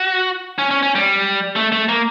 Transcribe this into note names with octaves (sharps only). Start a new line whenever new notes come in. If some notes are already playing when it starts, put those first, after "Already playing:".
Already playing: F#4
C#4
C#4
C#4
G3
A3
A3
A#3